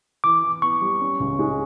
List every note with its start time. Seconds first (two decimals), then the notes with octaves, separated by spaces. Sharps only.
0.24 E3 D6
0.43 E3
0.62 B3 C#6
0.81 G3
1.01 C#4
1.20 C#2
1.39 G#3